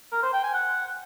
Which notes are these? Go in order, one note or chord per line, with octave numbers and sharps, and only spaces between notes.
A#4
C5
G5
G#5
F#5